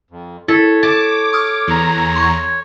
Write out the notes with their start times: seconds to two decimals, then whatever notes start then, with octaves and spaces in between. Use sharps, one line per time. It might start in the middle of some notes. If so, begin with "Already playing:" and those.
0.11 F2
0.48 E4 A4 C#5
0.83 A5 D6
1.33 C#6 D#6 F6
1.67 E2 A#5
2.16 C6 C#6 G#6